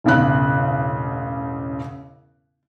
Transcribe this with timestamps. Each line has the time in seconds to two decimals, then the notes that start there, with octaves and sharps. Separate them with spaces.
0.04 E1 A1 C#3 F#6